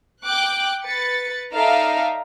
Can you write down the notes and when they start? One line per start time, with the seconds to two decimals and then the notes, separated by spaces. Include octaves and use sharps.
0.23 G5 D6 F#6
0.83 B4 A6 C#7
1.54 D#4 A4 D5 E5 F5 A#5